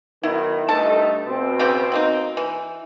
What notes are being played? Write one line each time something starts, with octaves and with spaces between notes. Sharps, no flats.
D#3 F#3 B3 E4
G2 A3 D#4 A4 A5
B2 C4
C#3 B3 G4
F#3 A#3 D#4
E3